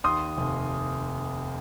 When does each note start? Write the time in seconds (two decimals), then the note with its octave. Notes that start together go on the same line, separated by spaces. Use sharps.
0.04 D#2 C6 D#6
0.37 F1